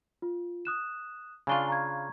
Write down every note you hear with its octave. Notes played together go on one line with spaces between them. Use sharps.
F4
D#6 F#6 E7
C#3 D4 F4 G#5 C#6 G7
A#5 C#6 G#6